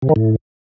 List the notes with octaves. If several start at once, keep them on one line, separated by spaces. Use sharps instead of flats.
C3
D#3
A2